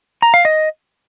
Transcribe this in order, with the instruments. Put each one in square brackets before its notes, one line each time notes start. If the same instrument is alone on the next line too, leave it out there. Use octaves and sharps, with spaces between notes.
[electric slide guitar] A#5
F5
D#5